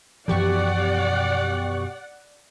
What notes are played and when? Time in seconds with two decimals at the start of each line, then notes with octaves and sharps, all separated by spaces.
0.28 F#2 B2 E3 F3 G4 D5 F#5 C#6